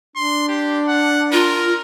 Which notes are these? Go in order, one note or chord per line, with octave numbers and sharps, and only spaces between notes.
D4 C6
G4
F#5
F4 A#4